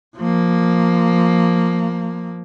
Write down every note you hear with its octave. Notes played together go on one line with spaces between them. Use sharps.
F3 A#3